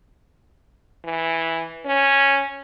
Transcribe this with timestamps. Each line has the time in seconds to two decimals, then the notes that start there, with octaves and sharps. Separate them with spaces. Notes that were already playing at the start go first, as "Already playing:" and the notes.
1.05 E3
1.86 C#4